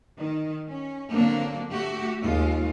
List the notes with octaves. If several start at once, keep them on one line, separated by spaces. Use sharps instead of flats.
D#3
C#4
D3 F#3 A#3 C4 D4
A3 F#4 G4
D#2 G#3 F4